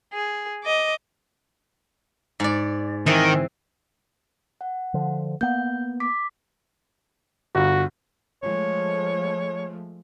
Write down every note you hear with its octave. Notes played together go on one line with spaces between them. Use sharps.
G#4
D#5 D6
G#2 D5
D#3 E3 C4 G#5
F#5
D3 F3
A#3 B3 G6
D6 B6
G1 F#4
F3 G#3 A3 C#5